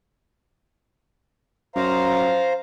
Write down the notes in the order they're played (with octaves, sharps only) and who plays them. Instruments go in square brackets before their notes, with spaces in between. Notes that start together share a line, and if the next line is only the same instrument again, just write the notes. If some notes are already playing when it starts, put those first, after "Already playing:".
[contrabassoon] F#2 [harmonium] C5 F5 A#5